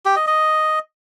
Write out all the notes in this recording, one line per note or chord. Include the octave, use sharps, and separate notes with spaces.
G4
D#5
D#5